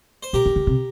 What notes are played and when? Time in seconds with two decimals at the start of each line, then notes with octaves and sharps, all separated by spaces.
0.23 C5
0.33 A#2 G4 A#4
0.46 D3
0.56 D3
0.67 C3